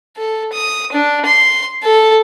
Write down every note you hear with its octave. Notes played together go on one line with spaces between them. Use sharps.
A4
D#6
D4
C6
A4